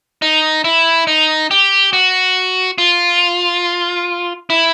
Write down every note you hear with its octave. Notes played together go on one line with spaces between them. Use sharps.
D#4
E4
D#4
G4
F#4
F4
E4